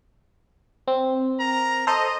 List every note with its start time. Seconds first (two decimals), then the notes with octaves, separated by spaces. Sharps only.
0.88 C4
1.38 A#4 A#5
1.87 A4 C5 D#5 A#5